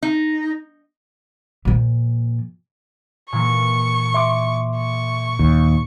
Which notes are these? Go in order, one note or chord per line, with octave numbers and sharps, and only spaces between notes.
D#4
A#2 F3
A#2 E3 A#3 C#6
E5 C6 D6
C#6
D#2